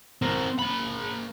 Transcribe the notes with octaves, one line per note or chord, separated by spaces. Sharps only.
C4 A#4
A#3 B5